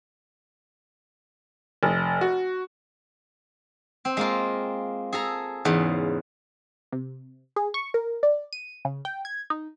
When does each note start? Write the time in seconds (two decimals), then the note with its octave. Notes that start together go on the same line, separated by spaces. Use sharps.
1.83 F1
2.21 F#4
4.05 C4
4.17 G#3 A#3 F4
5.13 G#4 A4 A#5
5.65 E2 G#2 C#3
6.92 C3
7.56 G#4
7.74 C#6
7.94 A#4
8.23 D5
8.53 D#7
8.85 C#3
9.05 G5
9.25 G#6
9.50 D#4